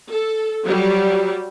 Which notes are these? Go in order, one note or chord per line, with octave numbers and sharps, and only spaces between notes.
A4
F#3 G3